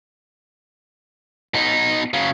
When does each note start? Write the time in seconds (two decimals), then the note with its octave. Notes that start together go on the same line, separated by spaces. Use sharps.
1.54 B2 D#4
2.14 C#3 F#3